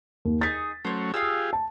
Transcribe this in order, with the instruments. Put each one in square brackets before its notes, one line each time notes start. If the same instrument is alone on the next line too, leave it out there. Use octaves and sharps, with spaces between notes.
[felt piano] D#2
[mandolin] D#4 G#4 [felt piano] A6 B6
[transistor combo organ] F#3 A3 C#4 [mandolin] C5 C#5
[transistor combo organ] F4 G4 G#4 [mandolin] F5 D#6 E6
[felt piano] A5